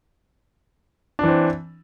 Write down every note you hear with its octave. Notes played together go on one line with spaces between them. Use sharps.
E3 C4 D4